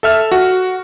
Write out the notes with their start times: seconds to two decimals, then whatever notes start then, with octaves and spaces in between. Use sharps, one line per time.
0.03 A4 E5 F6
0.32 F#4